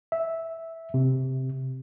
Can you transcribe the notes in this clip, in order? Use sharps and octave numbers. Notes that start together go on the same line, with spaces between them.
E5
C3